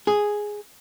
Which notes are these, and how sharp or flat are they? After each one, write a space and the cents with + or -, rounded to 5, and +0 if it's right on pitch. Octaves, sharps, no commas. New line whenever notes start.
G#4 +0